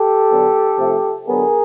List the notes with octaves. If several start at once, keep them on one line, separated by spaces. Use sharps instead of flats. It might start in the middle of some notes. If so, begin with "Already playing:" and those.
Already playing: G4 A4
D3 F#3 B3
C3 F3 A3
D3 F#3 B3 G#4 A#4